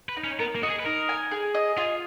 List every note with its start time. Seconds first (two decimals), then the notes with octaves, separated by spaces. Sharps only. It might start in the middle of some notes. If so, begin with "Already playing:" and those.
0.09 B4
0.17 D#4
0.24 C#4
0.39 B3 A#4
0.55 A#3
0.63 F#4 D#5
0.70 G#4
0.80 B4
0.86 D#4 A#4
1.09 G#5
1.31 G#4
1.54 D#5
1.77 F4 G#4